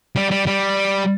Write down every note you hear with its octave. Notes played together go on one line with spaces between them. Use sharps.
G3
G3
G3